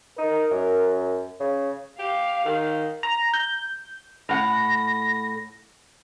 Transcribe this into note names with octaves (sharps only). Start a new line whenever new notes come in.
D#4 A#4
F#2
C#3
G4 F5
D#3
A#5
G6
A2 F#5 A#6